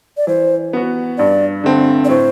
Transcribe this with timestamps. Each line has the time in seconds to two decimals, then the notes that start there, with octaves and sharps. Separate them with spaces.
0.17 D5
0.27 E3 C5
0.73 B3 F#4
1.18 G2 D5
1.64 D3 A3 C4
2.05 D5
2.09 A2 C5